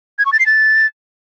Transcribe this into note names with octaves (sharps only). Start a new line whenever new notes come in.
G#6
C#6
A6
C7
A6